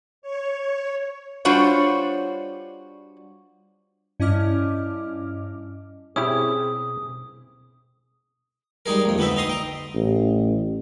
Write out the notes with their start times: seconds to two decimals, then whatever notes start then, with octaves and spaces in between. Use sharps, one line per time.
0.22 C#5
1.45 G3 D4 F4 F#4 C5 C#5
4.20 G2 C#4 E4 D#5 D6 F6
6.16 B2 C4 C#4 E4 G4 G#4 D#6
8.86 G3 G#3 D#4 G#4 A#4
9.05 A#1 F2
9.18 D2 B3 C4 D#4 E5
9.36 D#4 A#5 C6 D#6
9.49 D#5 G5
9.94 A1